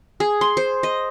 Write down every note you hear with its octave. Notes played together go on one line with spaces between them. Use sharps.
G#4
C6
C5
D#5